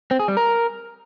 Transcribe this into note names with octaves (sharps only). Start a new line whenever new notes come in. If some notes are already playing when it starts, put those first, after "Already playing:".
C4
G#4
G3
A#4